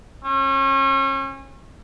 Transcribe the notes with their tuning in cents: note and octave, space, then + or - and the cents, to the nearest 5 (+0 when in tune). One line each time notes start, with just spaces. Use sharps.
C#4 -35